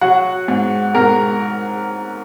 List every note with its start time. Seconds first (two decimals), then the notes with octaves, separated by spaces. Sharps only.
0.01 F#3 F#4 F#5
0.48 G#2
0.95 G#2 A#4 A#5